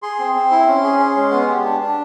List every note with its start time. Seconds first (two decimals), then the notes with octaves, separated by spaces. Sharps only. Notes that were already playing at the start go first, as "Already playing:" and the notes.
0.02 G#4 C6
0.19 C4
0.35 C4
0.51 E4
0.67 C#4
0.84 G#4
0.99 C#4
1.16 G#3
1.31 B3
1.48 G4
1.64 D4
1.80 D4